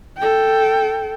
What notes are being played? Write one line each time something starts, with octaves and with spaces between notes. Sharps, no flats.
A4 G5